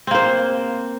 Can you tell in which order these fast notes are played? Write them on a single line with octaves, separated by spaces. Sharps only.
C4 A#3 C5